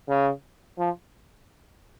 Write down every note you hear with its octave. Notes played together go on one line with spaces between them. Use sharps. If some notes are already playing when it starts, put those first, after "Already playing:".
C#3
F3